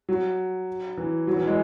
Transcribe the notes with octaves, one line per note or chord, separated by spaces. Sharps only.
F#3
E3
F#3
E3
G#3